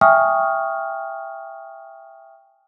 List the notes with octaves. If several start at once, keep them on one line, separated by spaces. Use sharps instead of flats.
E5 G5 G#5 C#6 D#6 F6